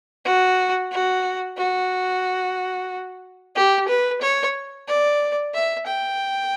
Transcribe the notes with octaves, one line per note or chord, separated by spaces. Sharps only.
F#4
F#4
F#4
G4
B4
C#5
D5
E5
G5